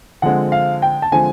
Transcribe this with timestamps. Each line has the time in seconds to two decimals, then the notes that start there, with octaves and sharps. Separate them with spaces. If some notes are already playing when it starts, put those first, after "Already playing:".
0.22 D3 F3 G#3 C4 F#5
0.52 F5
0.82 G5
1.02 A5
1.12 D3 F3 G#3 C4 G#5